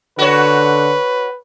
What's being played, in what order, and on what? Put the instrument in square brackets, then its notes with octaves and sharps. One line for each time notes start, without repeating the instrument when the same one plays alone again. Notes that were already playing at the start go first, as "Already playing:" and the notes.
[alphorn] D3 [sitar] F#4 C#5 [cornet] B4